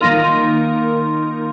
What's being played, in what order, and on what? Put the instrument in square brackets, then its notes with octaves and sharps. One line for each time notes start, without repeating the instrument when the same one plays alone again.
[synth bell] D#3 A#3 D#4 A#4 [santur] F4